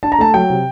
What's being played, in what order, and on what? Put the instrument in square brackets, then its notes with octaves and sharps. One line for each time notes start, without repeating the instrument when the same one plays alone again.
[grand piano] D4 A5
A#5
A3 A5
F#3 G5
C3